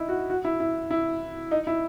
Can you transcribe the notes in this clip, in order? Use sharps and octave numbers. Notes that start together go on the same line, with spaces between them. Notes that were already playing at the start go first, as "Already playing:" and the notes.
Already playing: D#4 E4
F#4
F#4
E4
E4
E4
D#4
E4